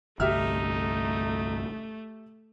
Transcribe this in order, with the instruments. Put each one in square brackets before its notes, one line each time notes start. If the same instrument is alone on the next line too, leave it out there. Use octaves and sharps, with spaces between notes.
[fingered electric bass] G1 C2 [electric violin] A3 [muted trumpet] D#4 [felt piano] G4 E5 F6